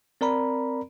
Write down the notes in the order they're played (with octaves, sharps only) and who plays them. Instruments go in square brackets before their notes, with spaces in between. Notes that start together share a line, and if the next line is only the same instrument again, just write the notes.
[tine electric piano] C4 A#4 D5 A#5 B5